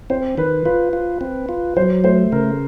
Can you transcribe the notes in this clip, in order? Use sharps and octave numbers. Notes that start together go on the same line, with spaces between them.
C4 C5
D#3 B4
F4 B4
F4
C4
F4
F#3 C5
A3 C5
C#3 A#4